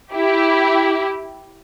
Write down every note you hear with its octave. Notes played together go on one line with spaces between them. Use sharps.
E4 G4